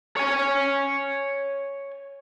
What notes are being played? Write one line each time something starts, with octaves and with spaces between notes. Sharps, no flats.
C#5 G#5